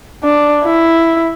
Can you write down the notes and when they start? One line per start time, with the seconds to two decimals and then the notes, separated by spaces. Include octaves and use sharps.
0.24 D4
0.64 E4